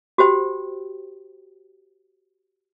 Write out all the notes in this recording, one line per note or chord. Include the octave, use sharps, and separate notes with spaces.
F#4 G4 C5 G5